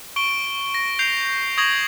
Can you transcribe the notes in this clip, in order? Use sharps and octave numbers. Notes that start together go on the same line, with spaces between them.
C#6 D7 G7
A#6
G6 C7 F7
C#6 D#6 G#6 A#6 F7 F#7